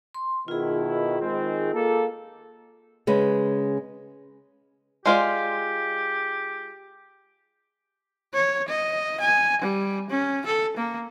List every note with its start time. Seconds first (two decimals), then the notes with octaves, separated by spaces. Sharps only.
0.15 C6
0.48 B2 D#3 E4 F4 G#4
1.21 D#3 G#3 C4
1.74 A#3 A4
3.07 C#3 G#3 C#4 B4
5.06 G#3 F4 G4 D5
8.34 C#5
8.68 D#5
9.21 G#5
9.62 G3
10.10 C#4
10.46 A4
10.77 A#3